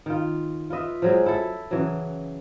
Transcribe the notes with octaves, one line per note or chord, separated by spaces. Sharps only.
D#3 F4
F4 B4 D#5 E5
F3 F#3 G#3
E4 A4 E5
C#3 E3 F#3